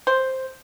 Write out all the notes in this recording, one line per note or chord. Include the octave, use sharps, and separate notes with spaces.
C5